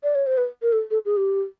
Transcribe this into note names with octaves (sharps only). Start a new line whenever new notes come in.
D5
C#5
C5
B4
A#4
A4
A4
G#4
G4